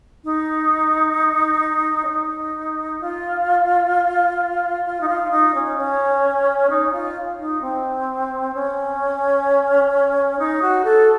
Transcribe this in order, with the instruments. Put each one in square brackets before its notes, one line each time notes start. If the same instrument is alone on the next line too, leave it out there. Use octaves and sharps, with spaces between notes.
[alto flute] D#4
C#4
D#4
F4
F4
D#4
F4
D#4
C#4
C#4
D#4
F4
D#4
C4
C#4
D#4
F#4
A4